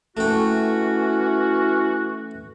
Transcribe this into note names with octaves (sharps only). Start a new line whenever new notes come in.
E3 A3 C#4 F#4 G5